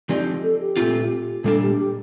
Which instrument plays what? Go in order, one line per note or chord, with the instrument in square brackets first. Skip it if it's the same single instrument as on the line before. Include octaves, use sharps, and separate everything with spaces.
[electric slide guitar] F3 C4 D#4 G4 [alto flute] D5
[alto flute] A4
G4
[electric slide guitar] A#2 A3 C4 F4
[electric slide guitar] A#2 G3 A#3 D4 [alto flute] A4
[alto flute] G4
G4